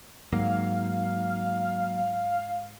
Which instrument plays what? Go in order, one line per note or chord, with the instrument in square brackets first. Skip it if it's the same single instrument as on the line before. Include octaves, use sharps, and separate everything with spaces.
[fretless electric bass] G#2 [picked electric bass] F#3 A#3 [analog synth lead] F5